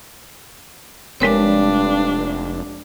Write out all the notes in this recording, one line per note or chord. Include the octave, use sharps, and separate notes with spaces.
F1 G2 G#3 D4 A#4 C#5